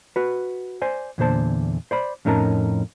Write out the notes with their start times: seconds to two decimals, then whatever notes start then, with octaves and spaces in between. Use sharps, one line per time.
0.16 F#4 B4
0.82 C5 D5 G#5
1.18 E2 A#2 D3 C5 A5
1.91 C5 D5 B5
2.25 F2 A2 C#4 D#4 A#4 A5